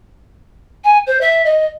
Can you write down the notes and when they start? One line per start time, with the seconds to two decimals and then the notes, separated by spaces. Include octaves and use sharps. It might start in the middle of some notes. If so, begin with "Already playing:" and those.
0.84 G#5
1.06 C5
1.21 E5
1.45 D#5